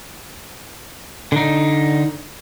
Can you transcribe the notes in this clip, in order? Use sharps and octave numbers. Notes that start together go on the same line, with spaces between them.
D3 D#4